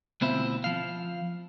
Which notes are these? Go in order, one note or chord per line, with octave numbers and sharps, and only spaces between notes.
D2 B2 C4 E4 F4 E5
F3 F5